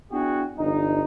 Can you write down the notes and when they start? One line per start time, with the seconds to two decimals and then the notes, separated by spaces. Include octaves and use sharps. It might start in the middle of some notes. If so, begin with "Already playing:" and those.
0.11 B3 D4 E4 F#4 G#4 G5
0.57 G1 G2 E3 D#4